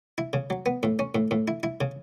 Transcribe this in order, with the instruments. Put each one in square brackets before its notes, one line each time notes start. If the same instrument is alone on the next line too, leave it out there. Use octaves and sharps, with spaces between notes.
[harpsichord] E4
C#3
F#3
B3
A2
C#4
A2
A2
E4
E4
C#3